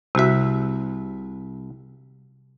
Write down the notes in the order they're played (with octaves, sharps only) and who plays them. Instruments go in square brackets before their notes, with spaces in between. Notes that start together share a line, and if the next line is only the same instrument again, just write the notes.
[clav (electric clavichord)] C2 E5 [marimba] C3 F#4